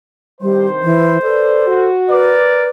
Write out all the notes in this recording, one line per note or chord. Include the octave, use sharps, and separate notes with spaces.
G2 C3 D#3 G3 C5
E3
A4 B4 D5
F#4
A#4 B4 D5